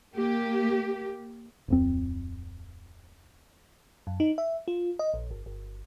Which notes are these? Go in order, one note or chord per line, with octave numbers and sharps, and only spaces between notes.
A#3 G4
D1 F2 C4
F#2
D#4
E5
F4
D#5
A#1
G1
G1